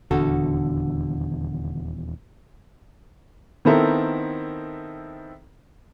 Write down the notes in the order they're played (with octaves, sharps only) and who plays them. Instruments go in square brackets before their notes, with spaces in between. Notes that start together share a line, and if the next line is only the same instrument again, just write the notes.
[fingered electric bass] D#1 E2 [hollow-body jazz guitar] D3 F#4 A4
[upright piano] D#3 B3 C4 E4 A4 A#4